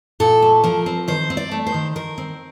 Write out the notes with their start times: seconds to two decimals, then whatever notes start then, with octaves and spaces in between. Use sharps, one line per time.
0.20 A#2 A4
0.42 A3
0.64 F3 A#4
0.86 C4
1.08 D#3 C5
1.30 C4
1.37 D5
1.51 A3
1.67 C5
1.74 D#3
1.96 D#3 A#4
2.18 C4